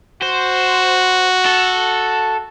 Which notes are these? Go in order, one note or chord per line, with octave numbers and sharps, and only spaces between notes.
F#4 C5
A4